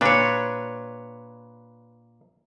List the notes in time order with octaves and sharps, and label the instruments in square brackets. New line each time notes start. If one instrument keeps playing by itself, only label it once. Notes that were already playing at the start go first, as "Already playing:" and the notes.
[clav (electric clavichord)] A#2 D4 [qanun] B4 C#5